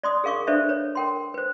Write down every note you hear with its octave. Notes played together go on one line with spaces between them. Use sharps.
D5 C6 D#6
G#4 A#4 F5 C#6 D6
D4 A4 B4 C5 D5 E5
B4 C#5
A#4 G5 C6
B4 C5